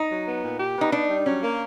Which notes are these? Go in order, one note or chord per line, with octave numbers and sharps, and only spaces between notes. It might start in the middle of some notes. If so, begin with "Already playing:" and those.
Already playing: D#4
F#3
B3
A#2
G4
B3 D#4
D4 D#4
G3
F#3 C#4
A#3